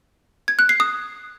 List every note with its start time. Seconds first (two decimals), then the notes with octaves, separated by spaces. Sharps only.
0.48 G#6
0.59 F#6
0.69 C7
0.80 D#6